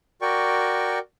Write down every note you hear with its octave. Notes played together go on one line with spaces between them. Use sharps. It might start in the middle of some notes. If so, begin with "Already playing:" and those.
F#4 A#4 D5 G5 C#6